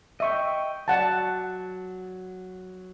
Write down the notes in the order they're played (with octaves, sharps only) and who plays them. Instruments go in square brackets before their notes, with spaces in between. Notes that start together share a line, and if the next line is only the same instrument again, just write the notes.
[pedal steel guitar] D#5 G5 [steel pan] E5 C#6
[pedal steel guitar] F#3 [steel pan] D5 F#5 A5